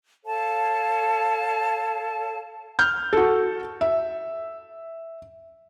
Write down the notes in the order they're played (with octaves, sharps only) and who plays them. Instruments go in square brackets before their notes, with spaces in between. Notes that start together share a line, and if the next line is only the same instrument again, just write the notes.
[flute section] A4 C#5 F5 A5
[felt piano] F6 G6
F#4 A4
E5